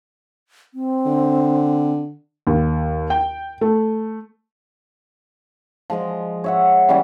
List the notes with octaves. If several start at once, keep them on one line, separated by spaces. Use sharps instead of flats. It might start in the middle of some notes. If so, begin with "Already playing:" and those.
C4
D3
D#2
G5
A3
F3 G#3 D#5
C#5 E5 F#5
E3 G3 C#4 E4